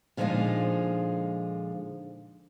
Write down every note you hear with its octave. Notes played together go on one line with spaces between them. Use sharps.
A#2 D3 F3 G#3 D#4 F4